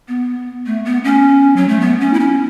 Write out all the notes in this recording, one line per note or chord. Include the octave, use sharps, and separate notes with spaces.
B3
A3
B3
C#4
F#3
A3
B3
C#4
E4
C#4